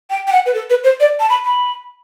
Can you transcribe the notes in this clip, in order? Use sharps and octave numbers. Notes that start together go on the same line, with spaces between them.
G5
G5
F#5
B4
A4
B4
C5
D5
A5
B5
B5